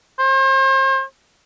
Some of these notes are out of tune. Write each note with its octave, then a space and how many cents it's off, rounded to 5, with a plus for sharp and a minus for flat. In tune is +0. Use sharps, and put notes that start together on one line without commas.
C5 +40